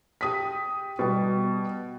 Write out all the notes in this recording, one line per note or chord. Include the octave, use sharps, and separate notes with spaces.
G4 D#6 B6
B2 G3